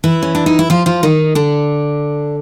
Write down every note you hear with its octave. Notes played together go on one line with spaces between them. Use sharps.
E3 E4
C#4
D4
D#4
E4
F3 F4
F3 F4
D#3 D#4
D3 D4